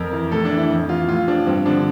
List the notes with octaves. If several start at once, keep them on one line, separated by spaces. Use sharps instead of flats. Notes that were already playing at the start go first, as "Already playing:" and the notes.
Already playing: F2 A#4
E3
A2 A4
D4
E3
E4
F2
E3 F4
A2 F4
F3 D4
G2 C4
D3 F3 D4